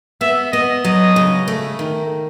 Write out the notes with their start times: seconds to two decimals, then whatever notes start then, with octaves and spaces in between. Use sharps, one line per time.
0.21 B3 E5
0.53 B3 D#5
0.84 F#3 D#5
1.16 C#3
1.48 A3
1.79 D#3